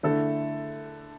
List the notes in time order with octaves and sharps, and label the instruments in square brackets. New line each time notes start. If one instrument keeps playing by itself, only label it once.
[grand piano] D3 A3 E4 A4